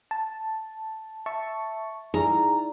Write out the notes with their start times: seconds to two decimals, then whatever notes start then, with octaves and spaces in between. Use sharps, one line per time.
0.11 A5
1.26 E5 A5 C#6
2.14 D#4 E4 G#4 D5 A#5